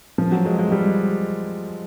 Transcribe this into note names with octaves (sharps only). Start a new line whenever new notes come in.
F3
F#3
G#3
G#3
G3